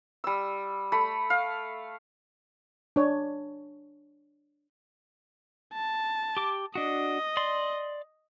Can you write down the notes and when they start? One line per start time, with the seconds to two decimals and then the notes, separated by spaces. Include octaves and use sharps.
0.24 G3 E6
0.92 A3 B5
1.30 F5
2.96 D4 C#5
5.74 A5
6.37 G4 D6
6.75 D4 F#4 D#5
7.37 D5 C6